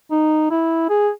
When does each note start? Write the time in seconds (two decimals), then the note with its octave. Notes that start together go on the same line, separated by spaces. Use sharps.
0.11 D#4
0.51 E4
0.89 G#4